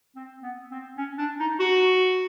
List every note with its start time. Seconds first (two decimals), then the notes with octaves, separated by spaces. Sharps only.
0.16 C4
0.43 B3
0.71 C4
0.98 C#4
1.18 D4
1.39 D#4
1.60 F#4